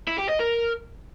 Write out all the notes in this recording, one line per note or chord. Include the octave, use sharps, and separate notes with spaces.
E4
G4
D#5
A#4